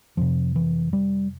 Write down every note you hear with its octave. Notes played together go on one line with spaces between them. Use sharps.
F2 C3 F3
E3
G3